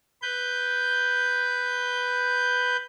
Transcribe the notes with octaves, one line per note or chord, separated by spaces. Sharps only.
B4 G6